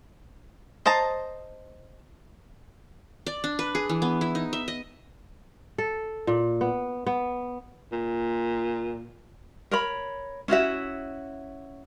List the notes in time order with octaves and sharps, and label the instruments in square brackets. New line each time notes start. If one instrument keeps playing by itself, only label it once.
[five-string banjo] C5 D#5 A5 A#5
[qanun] D5
D4
B4
G#4
E3
B3
E4
D#4
E5
D#5
[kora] A4
A#2
B3
B3
[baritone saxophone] A#2
[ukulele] A#4 C#5 B5
C#4 E4 F#4 E5